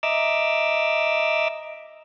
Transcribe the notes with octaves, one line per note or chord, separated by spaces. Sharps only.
D#5 E5 A#5 D6 E6